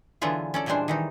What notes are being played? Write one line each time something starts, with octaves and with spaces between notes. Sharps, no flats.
D3 E3 F#3 B3 F4 G#4
C#4 A4 D5
A#2 E3 G3 G#3 D4 C5
D#3 E3 D#4